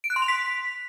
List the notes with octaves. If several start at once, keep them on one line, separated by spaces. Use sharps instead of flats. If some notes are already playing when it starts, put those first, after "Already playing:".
D7
F#6
C6
F7
B6